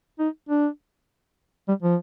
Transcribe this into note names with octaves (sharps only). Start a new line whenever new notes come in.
D#4
D4
G3
F3